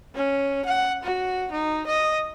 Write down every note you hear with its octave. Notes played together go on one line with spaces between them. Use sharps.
C#4
F#5
F#4
D#4
D#5